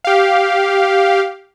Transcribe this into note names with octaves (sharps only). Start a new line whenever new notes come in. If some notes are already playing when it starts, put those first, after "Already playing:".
G4 F5